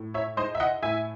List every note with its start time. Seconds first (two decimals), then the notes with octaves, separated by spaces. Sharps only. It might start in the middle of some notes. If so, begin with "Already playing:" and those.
Already playing: A2
0.14 C#5 E5
0.37 G#3 D#4 C5 D#5
0.55 E5
0.60 D#5 F#5
0.83 A2 E5 G#5